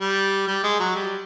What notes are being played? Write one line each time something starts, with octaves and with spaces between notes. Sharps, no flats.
G3
G3
G#3
F#3
G3